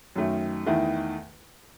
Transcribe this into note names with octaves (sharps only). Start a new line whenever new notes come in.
F#2 D#3 A3
E2 D#3 A3 E4